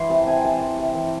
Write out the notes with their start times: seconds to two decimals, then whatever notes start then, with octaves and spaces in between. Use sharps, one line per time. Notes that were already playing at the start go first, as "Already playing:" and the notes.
Already playing: E3 C6
0.09 C3 A5
0.27 C4 G#5
0.44 C3 A5
0.61 E3
0.79 C3
0.95 E3